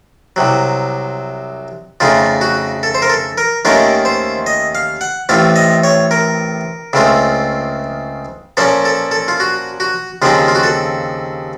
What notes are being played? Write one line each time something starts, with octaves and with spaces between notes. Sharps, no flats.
C2 C3 F#3
F2 C#3 A3 D#4 F4
F#4
A4
C5
A#4
A4
A#4
D#2 D#3 A3 C#4 F4 A#4
C5
D#5
F5
F#5
A1 A2 A3 C4 F4 F5
D#5
C#5
A#4
C#2 C#3 A3 C4 F4
A#2 F3 A#3 C#4 A4
A4
A4
F4
F#4
F#4
D#2 C#3 F3 C4 D#4 F4
F4
F#4
A4